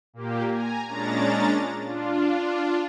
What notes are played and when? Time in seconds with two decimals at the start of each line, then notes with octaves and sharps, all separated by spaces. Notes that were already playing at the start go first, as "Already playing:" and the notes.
0.13 A#2 A#3 G4
0.47 G#5 A#5
0.88 A#2 G#3 C#4 D4 A#5 A6
1.85 D4 F4